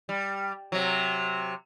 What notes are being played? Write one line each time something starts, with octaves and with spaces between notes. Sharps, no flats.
G3
C3 F#3